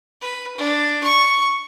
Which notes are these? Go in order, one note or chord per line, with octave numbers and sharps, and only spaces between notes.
B4
D4
C#6